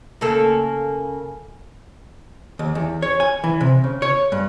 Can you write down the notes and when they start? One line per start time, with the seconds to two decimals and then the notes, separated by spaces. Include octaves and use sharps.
0.21 C#3 A#3 A4
2.59 D#2
2.75 E2
3.02 C#5
3.20 G#5
3.44 E3
3.61 C3
3.84 C#3
4.02 C#5
4.32 G2